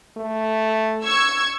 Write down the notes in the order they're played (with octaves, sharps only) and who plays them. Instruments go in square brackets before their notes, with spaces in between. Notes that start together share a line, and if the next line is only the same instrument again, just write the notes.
[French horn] A3
[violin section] C#6 E6 G#6